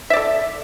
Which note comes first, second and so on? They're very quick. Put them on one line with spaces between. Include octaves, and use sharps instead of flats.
E5 D5 A4